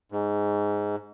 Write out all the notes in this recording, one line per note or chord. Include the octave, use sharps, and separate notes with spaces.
G#2